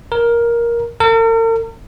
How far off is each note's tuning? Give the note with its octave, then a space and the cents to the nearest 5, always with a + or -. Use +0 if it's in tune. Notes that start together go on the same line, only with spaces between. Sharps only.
A#4 +10
A#4 -45